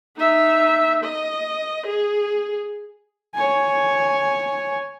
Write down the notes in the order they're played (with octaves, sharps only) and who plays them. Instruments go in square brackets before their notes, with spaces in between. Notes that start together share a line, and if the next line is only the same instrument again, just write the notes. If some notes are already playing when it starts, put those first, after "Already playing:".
[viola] D#4 E5
D#5
G#4
[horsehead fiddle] C#5 G#5